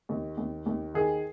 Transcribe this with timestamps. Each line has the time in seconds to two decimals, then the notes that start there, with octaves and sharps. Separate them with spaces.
0.09 D#2
0.37 D#2
0.66 D#2
0.94 D#3 G#4